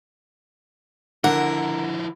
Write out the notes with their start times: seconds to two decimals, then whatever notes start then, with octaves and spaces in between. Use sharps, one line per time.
1.24 D3 F3 E4 A#4 F#5